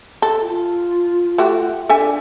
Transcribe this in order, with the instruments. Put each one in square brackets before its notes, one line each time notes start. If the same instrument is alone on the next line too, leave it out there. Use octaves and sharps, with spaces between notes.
[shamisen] A4
[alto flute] F4
[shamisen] A3 F#4 G4
[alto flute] D4 [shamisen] A4 E5 G#5